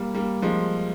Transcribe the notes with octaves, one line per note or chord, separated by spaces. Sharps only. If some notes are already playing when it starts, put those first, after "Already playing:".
Already playing: G3 A#3
G3 A#3
F3 G#3